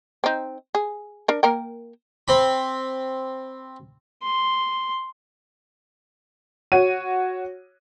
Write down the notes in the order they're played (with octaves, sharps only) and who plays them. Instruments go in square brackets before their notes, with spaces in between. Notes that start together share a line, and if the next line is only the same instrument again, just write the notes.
[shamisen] C4 D#4
G#4
D4 A#4
A#3 A#4 G5
[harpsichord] C4 B5
[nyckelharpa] C6
[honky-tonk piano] F#4 C#5 D#7